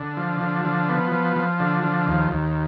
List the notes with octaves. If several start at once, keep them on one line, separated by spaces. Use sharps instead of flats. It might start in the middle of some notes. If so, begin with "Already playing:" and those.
Already playing: D3
F3
D3
F3
B3
F3
F3
D3
F3
D#2
D#2